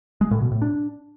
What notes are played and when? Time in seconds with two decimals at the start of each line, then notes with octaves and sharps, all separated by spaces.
0.21 G#3
0.31 A2
0.41 B2
0.51 A2
0.62 D4